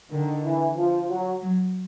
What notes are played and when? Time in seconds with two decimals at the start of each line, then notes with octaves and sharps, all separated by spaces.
0.11 D3 D#3
0.44 E3
0.76 F3
1.10 F#3
1.41 F#3